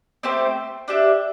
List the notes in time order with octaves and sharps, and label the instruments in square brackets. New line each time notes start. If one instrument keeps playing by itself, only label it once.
[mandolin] A3 C4 G4 C5
D4 G4 E5